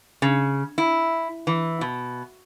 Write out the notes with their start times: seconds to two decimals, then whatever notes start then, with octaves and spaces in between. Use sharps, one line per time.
0.22 C#3
0.78 E4
1.47 E3
1.81 B2